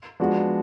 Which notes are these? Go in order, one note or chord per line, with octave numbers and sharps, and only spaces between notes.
F3 G#3 B3 D4 F#4